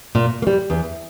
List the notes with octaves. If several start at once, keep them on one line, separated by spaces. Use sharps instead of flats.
A#2
A#3
G3
E2